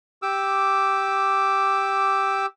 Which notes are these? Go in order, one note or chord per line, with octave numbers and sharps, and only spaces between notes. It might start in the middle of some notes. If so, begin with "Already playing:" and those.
G4 D6 E6